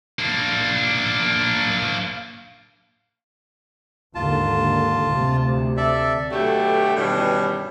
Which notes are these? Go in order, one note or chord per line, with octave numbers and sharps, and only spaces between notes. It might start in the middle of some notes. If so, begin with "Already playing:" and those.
A#3 D4
D#2 G#2 D3 F4 A5
D2 C3
A4 D5 E5
B2 D3 F#3 A3 G4
G2 B2 D#3 E3 G3 C#4